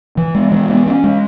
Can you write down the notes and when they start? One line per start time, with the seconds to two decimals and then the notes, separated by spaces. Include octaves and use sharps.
0.17 E3
0.35 G#3
0.52 E3
0.69 B3
0.87 C#4
1.04 G#3